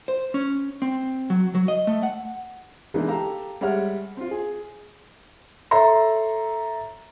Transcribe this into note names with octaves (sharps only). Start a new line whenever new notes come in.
C5
C#4
C4
F#3
F#3
D#5
A3
F#5
E3 G#3 A#3 B3 D4 D#4
G4 A4 F5 A5 A#5
G3 G#3 C#5 E5 F#5 F6
C4 F4
G#4
A4 C#5 E5 A#5 C6